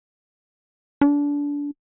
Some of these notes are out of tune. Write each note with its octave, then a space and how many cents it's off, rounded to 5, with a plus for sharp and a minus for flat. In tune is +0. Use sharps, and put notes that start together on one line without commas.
D4 -25